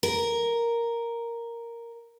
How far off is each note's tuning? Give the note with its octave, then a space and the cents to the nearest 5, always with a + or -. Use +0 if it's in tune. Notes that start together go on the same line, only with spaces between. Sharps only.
A#4 +0